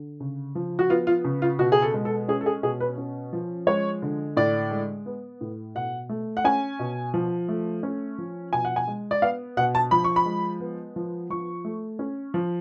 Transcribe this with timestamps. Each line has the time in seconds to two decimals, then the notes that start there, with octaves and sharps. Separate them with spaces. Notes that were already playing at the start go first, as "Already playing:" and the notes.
Already playing: D3
0.20 C#3
0.55 F3
0.79 F#4
0.90 B3 F4
1.07 F4
1.25 C#3
1.42 F4
1.59 B2 F#4
1.72 G#4
1.82 A4
1.94 G#3
2.05 A4
2.28 C#4 G#4
2.41 A4
2.46 G#4
2.63 B2 G#4
2.80 B4
2.98 C#4
3.33 F3
3.67 G#3 C#5
4.02 D3
4.37 A2 D5
4.71 G#3
5.06 B3
5.41 A2
5.75 B2 F#5
6.09 A3
6.37 F#5
6.44 C#4 G#5
6.79 B2
7.14 F3
7.49 A3
7.83 C#4
8.18 F3
8.53 B2 G#5
8.65 F#5
8.76 G#5
8.87 G#3
9.11 D5
9.22 B3 F5
9.57 B2 F#5
9.75 A5
9.91 F3 B5
10.04 C#6
10.16 B5
10.26 G#3
10.60 B3
10.96 F3
11.30 F3 C#6
11.65 A3
11.99 C#4
12.34 F3